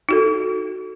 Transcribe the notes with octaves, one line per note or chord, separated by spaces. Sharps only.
D#4 F#4 A4